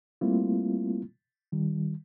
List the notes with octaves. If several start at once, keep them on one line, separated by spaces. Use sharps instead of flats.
G3 A3 A#3 C4 E4 F4
D#3 G3